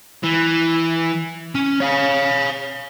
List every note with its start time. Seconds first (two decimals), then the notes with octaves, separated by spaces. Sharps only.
0.24 E3
1.55 C#4
1.80 C#5 F5